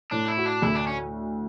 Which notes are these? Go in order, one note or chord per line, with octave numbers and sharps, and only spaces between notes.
A2 D4
E4
F#4
D4
D2 E4
D4
C#4